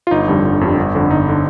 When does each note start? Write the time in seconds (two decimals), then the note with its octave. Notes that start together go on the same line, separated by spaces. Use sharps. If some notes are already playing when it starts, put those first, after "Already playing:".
0.07 F4
0.11 G1 D#4
0.28 F2 D3 G3
0.44 G1
0.61 F2 D3 G3
0.78 G1
0.95 F2 D3
1.10 G1 D#4
1.29 D3